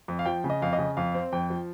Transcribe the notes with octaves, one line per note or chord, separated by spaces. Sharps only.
F2
F5
F3 G5
C#3
D#5
F2 F5
D#5
C#3
F2 F5
C4
F2 G5
F3